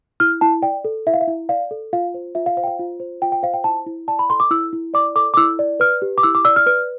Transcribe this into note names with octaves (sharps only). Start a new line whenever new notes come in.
E4 F6
E4 A5
D5 G5
A4
E4 E5
F5
E5
E4
D5 F5
A4
F4 F5
C5
F4 E5
F5
C5 F5
G5
F5
F4
C5
F4 G5
G5
C5 F5
G5
E4 A5
E4
D5 A5
B5
A4 C6
D6
E4 E6
E4
D5 D6
A4 D6
D6
E4 E6
D5
B4 F6
G4
D6
E4 E6
D6
D5 E6
F6
B4 F6